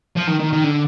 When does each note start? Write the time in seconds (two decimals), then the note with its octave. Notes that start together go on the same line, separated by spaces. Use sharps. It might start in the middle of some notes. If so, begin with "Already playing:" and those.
0.16 F3
0.27 D#3
0.39 D#3
0.52 D#3
0.64 D3